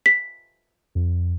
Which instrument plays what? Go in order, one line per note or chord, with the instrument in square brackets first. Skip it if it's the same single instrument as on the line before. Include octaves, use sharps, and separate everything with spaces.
[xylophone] B6
[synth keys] F2